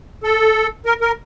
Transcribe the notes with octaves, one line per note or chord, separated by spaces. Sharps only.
A4
A#4
A#4